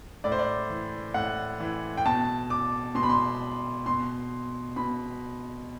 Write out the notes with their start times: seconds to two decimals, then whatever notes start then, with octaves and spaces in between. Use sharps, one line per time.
0.24 A2 D5
0.32 C5
0.39 D5
0.70 E3
1.14 A2 F#5
1.60 E3
1.97 G5
2.05 B2 A5
2.50 D6
2.95 B2 C6
3.03 B5
3.10 C6
3.86 B2 C6
4.76 B2 B5